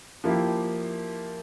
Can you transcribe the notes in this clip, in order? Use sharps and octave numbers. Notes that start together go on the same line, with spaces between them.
F3 A#3 E4 G4